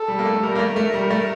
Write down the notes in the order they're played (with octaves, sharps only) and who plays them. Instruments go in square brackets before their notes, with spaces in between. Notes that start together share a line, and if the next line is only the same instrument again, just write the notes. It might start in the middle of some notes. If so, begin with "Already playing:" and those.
Already playing: [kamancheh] A4
[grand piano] G3
A#3
A3
A3
[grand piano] G3 [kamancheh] A#4
[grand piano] A#3
A3
A3
G3
A3